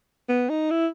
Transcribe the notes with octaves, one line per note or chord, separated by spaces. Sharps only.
B3
D#4
E4